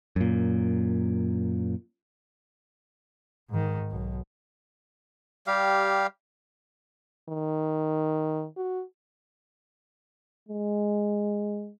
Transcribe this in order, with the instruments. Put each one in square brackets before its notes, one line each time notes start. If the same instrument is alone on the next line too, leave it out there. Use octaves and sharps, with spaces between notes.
[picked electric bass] F#2 A#2
[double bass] G#2 D#3
B1 B2
[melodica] G3 G4 F5
[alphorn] D#3
F#4
[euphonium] G#3